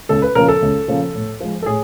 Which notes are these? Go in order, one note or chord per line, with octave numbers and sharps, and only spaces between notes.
C#2 A4
B4
C#3 F3 A#3 A#4
A4
C#2
C#3 F3 A#3
A2
F3 G#3
A4
A2 G#4